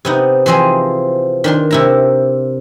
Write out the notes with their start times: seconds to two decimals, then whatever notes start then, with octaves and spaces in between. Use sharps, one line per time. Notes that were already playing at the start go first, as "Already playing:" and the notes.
0.05 C3 B3 D#4
0.46 E3 F3 C4 G#4 D#5
1.44 D#3 D4 C6
1.71 C3 E4 A#5